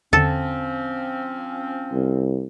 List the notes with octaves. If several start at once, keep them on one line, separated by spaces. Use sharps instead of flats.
E2 D3 F3 C4 C#4 A4
C2